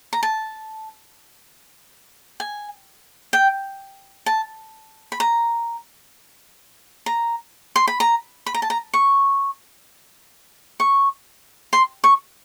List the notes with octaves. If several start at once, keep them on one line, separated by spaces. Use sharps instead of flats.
A#5
A5
G#5
G5
A5
B5
A#5
A#5
C6
B5
A#5
B5
A#5
A5
A#5
C#6
C#6
C6
C#6